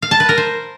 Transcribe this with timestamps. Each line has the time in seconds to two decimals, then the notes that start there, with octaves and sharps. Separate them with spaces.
0.02 F5
0.11 A5
0.20 B4
0.29 A#4
0.38 C5